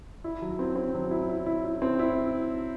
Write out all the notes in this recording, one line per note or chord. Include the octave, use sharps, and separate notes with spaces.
E4
F#3
C4
C4
F#3
E4
E4
E4
E4
C4
E4